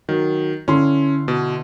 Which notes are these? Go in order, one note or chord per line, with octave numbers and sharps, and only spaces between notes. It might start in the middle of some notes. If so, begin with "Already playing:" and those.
D#3 F#3
D3 C#4 E4 C6
B2